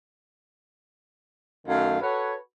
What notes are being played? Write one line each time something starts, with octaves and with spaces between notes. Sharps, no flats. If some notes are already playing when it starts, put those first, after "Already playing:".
F#2 D#3 A3 F5
F#4 A4 B4 C#5